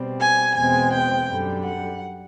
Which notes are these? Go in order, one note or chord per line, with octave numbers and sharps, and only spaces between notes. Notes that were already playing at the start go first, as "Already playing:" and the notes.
Already playing: B2 G3 C4
G#5
E2 B2 G#3 C4 G#5
G5
F#2 D3 G3
F#5